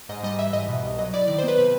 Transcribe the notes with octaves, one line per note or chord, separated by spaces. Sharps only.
G#2 D#5
G3 D#5
E3 E5
G#2 D#5
B2
C2
F#3 D#5
E4 D5
D#3 D5
C5
B3 B4
C3 B4